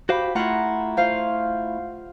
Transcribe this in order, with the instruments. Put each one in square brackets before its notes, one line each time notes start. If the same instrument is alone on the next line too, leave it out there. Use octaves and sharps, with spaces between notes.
[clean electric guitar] F#4 C5 F5 [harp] G4 B5
[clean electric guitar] A3 E4 [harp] F4 F#5 A#5
[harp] F4 C5 F5